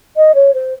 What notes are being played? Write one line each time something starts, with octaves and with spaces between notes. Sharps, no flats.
D#5
C#5
C5